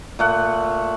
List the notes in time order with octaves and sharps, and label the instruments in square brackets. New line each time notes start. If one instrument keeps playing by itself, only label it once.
[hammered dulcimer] A#2 A3 F#5